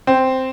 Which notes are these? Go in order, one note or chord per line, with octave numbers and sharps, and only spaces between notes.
C4